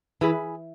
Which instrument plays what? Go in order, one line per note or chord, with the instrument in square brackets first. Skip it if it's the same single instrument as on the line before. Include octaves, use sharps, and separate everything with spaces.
[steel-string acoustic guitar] E3 [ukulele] E4 G#4 B4